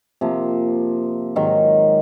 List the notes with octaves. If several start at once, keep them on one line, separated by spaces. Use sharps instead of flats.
C3 F3 A#3
G#2 D#3 F#3